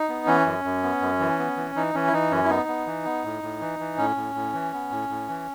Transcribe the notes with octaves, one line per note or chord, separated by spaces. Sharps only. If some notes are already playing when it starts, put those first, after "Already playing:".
Already playing: D#4
B3
E3 C#4
F#2
F#2
B3
F#2
E3
B3
E3
E3 D#4
E3 C#4
E4
E3 D#4
F#2 C#4
E4
B3 D#4
B3
E3
B3
A2
A2
E3
E3
A2 C#4
A2
A2
E3
B3
A2
A2
E3